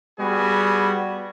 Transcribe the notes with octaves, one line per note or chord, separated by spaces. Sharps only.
G3 B3 F#4 G#4